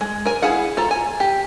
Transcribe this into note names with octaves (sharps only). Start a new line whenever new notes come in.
G#3
A#4 G#5
E4 G#4 F5 F#5
F4 A4 A#5
G#5
G4